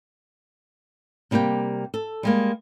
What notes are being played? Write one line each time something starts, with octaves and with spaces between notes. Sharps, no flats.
C3 G3 A#3 G4 G5
A4
G3 G#3 A#3